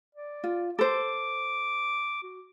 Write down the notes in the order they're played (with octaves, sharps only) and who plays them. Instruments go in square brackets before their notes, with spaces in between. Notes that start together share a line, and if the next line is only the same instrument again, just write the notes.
[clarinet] D5
[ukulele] F4
[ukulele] A4 C5 [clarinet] D6
[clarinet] F#4